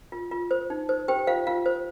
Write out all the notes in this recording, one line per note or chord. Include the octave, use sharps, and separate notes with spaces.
F4
F4
C5
D#4
C5
G4 C5 G5
F4 C5 F5
F4 F5
C5